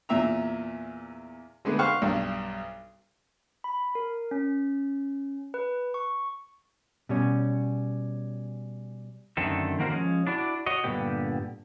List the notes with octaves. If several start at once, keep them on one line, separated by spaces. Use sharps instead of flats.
E2 A#2 E5 A#5
D3 G#3 A3 B3
C5 F5 F#5 C#6
B1 G2 D4
B5
A#4
C#4
B4
C#6
B2 G3 C#4
F#2 D3 D#3 A3 C4 A4
D#3 A#3 F#4 A#4 C5
F3 G#3 C#4
D4 E4 F#4 D5
F#4 C#5 D#5
G2 A#2 D3 E3 B3 G4